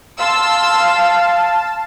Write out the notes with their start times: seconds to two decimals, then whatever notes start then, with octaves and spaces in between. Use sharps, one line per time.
0.19 F5 A5 C6 E6